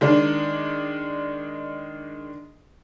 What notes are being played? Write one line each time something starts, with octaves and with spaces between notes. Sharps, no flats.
D#3 G#3 D4